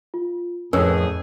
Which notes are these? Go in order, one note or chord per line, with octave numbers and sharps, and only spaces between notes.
F4
F2 A2 C#4 G#4 A#4 B4 E6